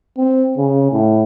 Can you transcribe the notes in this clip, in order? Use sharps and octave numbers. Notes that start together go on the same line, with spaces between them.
C4
C#3
A2